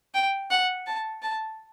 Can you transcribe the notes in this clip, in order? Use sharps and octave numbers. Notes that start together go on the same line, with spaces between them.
G5
F#5
A5
A5